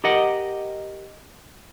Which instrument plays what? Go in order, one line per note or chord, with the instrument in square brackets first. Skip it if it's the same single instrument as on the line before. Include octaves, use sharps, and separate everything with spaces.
[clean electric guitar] G4 A#4 D#5 F#5